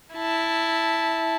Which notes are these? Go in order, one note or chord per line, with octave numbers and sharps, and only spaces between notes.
E4 A5